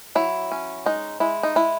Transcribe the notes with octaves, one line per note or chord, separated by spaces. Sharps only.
F#3 E4
C#4
G#3 D#4
G#3 E4
D#4
G#3 E4